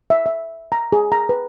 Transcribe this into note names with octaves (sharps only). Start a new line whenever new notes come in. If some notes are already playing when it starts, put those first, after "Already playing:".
E5
E5
A#5
G#4
A#5
B4